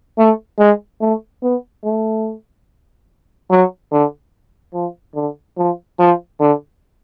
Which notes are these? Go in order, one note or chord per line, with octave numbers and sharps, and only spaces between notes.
A3
G#3
A3
B3
A3
F#3
D3
F3
D3
F3
F3
D3